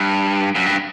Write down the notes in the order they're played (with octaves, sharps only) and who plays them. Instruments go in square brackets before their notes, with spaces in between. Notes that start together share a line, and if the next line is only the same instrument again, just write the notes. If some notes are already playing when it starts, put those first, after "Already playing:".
Already playing: [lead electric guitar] G2
F#2
G2